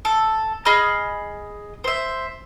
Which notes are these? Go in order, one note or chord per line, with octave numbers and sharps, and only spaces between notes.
A4
G#4 D#5 B5 F6
C5 E5